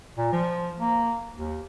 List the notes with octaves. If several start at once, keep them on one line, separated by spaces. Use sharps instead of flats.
A#2
F3
A#3
D#2